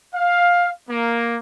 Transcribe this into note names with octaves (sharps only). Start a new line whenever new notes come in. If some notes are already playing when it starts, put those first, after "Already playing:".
F5
A#3